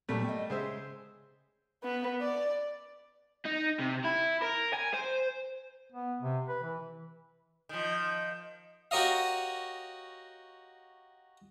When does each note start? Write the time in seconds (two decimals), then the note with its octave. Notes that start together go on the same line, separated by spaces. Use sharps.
0.09 A#2 F#3 G3 A3 B3
0.24 D#5 G5
0.50 C#3 G#3 C5 E5
1.83 B3
2.22 D5
3.46 D#4
3.80 C3
4.05 E4
4.43 A#4
4.74 G#5
4.94 C5
5.92 B3
6.21 C3
6.48 B4
6.63 E3
7.69 D#3 F3
8.91 F#4 G4 A#4 C#5 D#5 F5